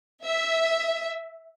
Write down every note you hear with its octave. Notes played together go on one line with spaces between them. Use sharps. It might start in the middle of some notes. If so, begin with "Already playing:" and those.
E5